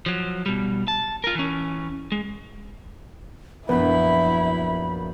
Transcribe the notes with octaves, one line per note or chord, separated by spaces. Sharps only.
F3 F#3
B2 G3
A5
F4 A#4
E3 C#4
G#3
A#1 F#2 B3 E4 B5